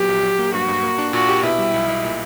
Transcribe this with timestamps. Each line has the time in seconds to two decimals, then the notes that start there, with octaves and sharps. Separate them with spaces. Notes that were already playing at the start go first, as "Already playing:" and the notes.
Already playing: A#2 F#3 B3 G4
0.09 A#1
0.23 F#3
0.39 A#3
0.53 G2 F#4
0.68 G2
0.83 A#3
0.98 D4
1.13 A#2 F#4
1.29 G4
1.43 B2 E4
1.58 G3
1.74 B1
1.88 B1
2.04 A#2